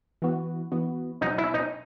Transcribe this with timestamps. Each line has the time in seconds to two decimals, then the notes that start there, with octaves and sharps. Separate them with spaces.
0.22 E3 B3 F#4
0.72 E3 B3 F#4
1.21 B2 F#3 B3 D#4 F#4
1.38 E4
1.54 D#4